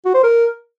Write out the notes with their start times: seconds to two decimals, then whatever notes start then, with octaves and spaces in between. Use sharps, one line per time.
0.05 F#4
0.14 C5
0.23 A#4